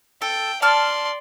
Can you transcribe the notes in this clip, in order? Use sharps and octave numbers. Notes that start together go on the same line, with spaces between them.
A4 G5
D5 A5 C6 F6